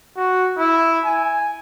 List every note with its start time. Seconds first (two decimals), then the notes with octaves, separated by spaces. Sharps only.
0.17 F#4
0.58 E4
1.05 G#5